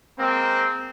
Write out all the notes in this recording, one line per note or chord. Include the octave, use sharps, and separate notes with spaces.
G#3 A#3 C4